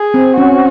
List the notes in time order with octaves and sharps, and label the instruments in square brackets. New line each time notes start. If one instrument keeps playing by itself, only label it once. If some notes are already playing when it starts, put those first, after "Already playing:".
Already playing: [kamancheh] G#4
[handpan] C4
[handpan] C#4 [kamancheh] F#4